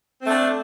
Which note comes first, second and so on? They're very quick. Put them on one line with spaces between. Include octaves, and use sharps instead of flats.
C4 A3 D4